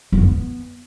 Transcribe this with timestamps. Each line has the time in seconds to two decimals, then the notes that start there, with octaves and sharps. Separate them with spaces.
0.12 F#3
0.18 F2
0.23 B3